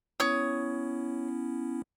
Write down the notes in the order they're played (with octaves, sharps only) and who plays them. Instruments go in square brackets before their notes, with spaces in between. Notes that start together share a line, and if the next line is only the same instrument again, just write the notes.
[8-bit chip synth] B3 C#4 E4 [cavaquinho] C#5 D#6